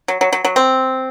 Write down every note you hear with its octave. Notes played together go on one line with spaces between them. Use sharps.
F#3
F#3
F#3
F#3
C4